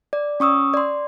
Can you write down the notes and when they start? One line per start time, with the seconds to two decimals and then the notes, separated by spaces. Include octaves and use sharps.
0.13 D5
0.40 C#4 C#6 D#6 E6
0.74 D5 C6